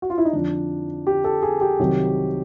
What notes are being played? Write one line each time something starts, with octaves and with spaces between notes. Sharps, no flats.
F#4
F4
E4
D#4
F2 D3 F3 D4
G4
A4
G#4
G4
C2 C3 D#3 F#3